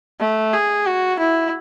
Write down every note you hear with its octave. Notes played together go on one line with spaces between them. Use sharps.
A3
G#4
F#4
E4